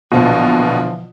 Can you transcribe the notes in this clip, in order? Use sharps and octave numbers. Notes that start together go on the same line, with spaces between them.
A#1 B2 D3 E3 F3